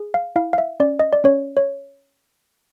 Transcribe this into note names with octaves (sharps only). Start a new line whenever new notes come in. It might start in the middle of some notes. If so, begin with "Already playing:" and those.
Already playing: G#4
F5
E4 F5
F5
E5
C#4 D5
D#5
D5
C#4 C#5
C#5